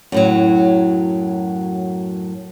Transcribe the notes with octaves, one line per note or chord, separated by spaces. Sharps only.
F#2 A2 F#3